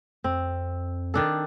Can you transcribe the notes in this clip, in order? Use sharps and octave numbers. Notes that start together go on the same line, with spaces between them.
F2 C4
D#3 D4 A4